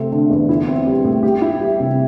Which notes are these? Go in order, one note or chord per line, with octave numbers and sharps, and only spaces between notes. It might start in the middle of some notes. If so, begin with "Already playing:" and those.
Already playing: C3 A3 C4
D3
E2
E4
C4
G3
A2
G4
E4
G3
C3